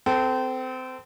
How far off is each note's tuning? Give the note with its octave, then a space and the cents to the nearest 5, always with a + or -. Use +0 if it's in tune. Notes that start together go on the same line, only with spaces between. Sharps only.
C4 -25 A4 +0